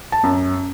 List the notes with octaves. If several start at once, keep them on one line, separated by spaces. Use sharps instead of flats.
A5
F#2